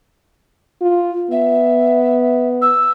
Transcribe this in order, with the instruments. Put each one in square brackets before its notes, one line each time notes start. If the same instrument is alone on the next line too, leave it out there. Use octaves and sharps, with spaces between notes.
[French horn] F4
[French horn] B3 [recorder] E5
[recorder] E6